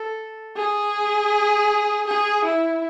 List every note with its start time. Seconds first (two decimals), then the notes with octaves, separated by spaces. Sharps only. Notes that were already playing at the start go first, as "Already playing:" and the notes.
Already playing: A4
0.57 G#4
2.07 G#4
2.45 E4